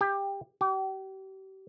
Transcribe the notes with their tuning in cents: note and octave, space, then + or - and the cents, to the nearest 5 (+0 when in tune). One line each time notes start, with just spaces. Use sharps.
G4 +15
G4 -40